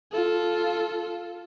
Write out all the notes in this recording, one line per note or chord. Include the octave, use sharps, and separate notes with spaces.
F4 A4